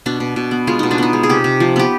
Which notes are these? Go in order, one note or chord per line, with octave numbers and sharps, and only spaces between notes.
B2 D4
B2
B2
B3
G#3 F4
B2 D#4
D4
B3 D#4
G#3
G#4
C3 G4
C3
F3
B3 G4